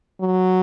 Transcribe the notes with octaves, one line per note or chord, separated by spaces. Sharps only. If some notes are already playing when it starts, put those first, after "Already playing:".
F#3